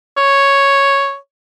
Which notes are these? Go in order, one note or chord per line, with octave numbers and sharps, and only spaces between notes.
C#5